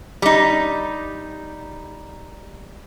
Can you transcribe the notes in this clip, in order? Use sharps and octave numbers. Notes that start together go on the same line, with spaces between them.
G3 D#4